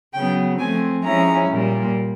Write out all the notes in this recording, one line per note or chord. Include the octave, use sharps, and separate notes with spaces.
C#3 F#3 B3 G5
F3 A3 C4 G#5
F3 G#3 C#4 E4 A#5
A#2 G3 A#3